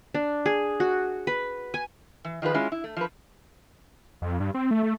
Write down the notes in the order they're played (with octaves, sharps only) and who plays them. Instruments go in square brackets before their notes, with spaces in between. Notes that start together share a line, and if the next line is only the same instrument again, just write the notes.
[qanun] D4
G#4
F#4
B4
G#5
[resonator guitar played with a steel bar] E3
D#3 F3 F4 G#4 B4
G#3 C#4 E4 F4
E4
A3
F3 B4
[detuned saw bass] F2
G2
C4
A3
A3